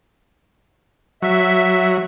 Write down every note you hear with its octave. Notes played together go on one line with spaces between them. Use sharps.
F#3 E5